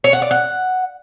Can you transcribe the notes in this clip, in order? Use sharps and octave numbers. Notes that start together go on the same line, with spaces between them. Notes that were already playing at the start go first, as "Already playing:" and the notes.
C#5
F#5
D5
F#5